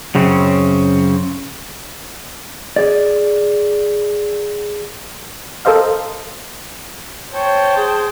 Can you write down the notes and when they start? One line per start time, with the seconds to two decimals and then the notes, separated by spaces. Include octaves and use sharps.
0.15 F#2 C#3 C4 C#4
2.76 G#4 D5
5.65 A4 A#4 C5 D#5 F5
7.32 C5 C#5 G5 A5
7.77 G#4